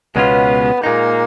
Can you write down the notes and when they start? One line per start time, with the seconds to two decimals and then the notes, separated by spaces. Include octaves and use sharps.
0.16 C#2 B2 G#3 B3 C#4 F4
0.83 A#2 G#3 A#3 D#4